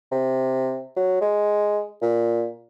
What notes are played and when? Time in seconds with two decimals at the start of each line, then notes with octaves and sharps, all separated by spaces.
0.12 C3
0.97 F#3
1.21 G#3
2.02 A#2